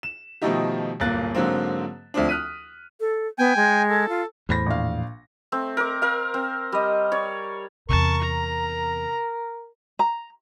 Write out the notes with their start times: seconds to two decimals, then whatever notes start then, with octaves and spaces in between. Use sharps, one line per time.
0.03 E7
0.42 B2 D#3 F3 A3 D#4 G4
1.00 D1 G1 A#2 A#3 F#6 A6
1.35 G#2 D3 F#3 A#3 C4
2.14 D2 F3 C4 D4
2.29 D#6 F6 F#6 B6 D#7
3.00 A4
3.38 B3 G5 G#5
3.56 G#3
3.90 A4
4.09 F4
4.49 E2 A2 C5 B5 A#6
4.66 A#1 F5
5.52 A3 C4
5.77 A#4 D6
6.02 A#4 F5
6.34 C4
6.72 G3 D#5
7.12 C#5 D5
7.89 E2 C3 A#4 A5 C#6
8.23 A#5
9.99 A#5